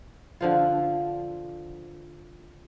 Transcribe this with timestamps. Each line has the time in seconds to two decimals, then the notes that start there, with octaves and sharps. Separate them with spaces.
0.41 D3 F3 F4